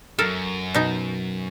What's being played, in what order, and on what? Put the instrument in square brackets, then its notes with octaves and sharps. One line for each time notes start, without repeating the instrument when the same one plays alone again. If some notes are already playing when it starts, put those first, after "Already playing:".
[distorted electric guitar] F#2 [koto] A4 A#4
[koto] B2 D#4